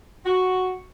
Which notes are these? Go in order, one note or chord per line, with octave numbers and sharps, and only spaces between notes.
F#4